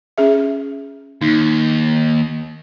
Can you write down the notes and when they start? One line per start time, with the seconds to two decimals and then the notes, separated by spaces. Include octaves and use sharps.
0.18 C#4 G#4 E5
1.21 D#2 D#4